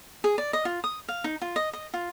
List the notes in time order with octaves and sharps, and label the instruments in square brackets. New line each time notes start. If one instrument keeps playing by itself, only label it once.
[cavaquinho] G#4
D5
D#5
F4
D#6
F5
D#4
F4
D#5
D#5
F4